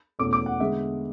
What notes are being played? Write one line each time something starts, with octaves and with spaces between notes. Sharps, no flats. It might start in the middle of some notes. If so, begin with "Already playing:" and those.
E2 B2 A3 C#4 D6
D6
F#5
D3 G#3 B3 E5